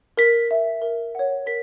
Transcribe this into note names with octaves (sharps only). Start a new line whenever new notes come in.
A#4 B6
E5
A#4
C#5 F#5
A#4 B6